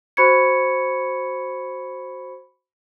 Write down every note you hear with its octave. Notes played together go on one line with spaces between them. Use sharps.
F#4 C5 B5 C#6 G#6 C#7